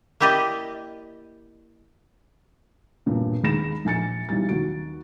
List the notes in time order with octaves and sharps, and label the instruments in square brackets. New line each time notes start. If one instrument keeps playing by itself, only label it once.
[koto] A#3 E4 G4 D5 D#5
[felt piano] E1 G2 A#2
D#2 G#3 B5 A#6 E7
A#1 G#5 A6 C#7
B1 E3 G3 A6
D#2 F#4 D7